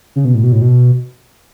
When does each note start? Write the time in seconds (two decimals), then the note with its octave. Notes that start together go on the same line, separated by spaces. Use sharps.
0.16 C#3
0.25 B2
0.34 A2
0.43 B2
0.52 A2
0.61 B2